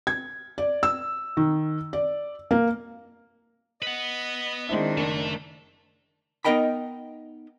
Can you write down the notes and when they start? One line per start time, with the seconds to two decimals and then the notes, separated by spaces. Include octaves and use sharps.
0.07 G#6
0.58 D5
0.83 E6
1.37 D#3
1.93 D5
2.51 A#3
3.82 B4 D#5 F#5
4.69 D#3 G#3 C4 D4 E4
4.98 F#1 A3
6.45 B3 D#4 A#4 D#5 G5 B5